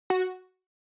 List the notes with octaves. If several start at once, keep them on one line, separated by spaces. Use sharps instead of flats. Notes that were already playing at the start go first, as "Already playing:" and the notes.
F#4